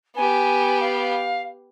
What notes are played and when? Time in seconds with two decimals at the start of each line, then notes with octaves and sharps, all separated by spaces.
0.16 B3 G4 G#5
0.80 F5